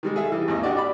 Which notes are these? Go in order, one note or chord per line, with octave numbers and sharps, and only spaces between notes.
D#3 G3 G#3
G#4 A4 E5
E3 G3
G#1 D#2 D#5
D4 F#4 G4 D5
D5 B5